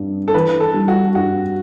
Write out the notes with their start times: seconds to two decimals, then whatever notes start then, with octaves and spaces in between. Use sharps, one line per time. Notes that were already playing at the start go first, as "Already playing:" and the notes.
Already playing: G2 G3 D4
0.28 A4
0.34 E3 B4
0.60 A4
0.74 G3
0.88 F#4
1.15 G2 F#4